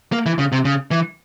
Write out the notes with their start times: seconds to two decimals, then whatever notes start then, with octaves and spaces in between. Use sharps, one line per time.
0.12 A#3
0.26 E3
0.39 C#3
0.52 C3
0.65 C#3
0.91 E3